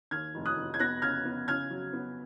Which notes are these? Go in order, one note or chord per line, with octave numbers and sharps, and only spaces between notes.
D#2 F6 G#6
F1
D#6 F#6
F1
G#6
B3 F#6 A#6
C#3 F6 G#6
B3
C#3 F6 G#6
F#3
B3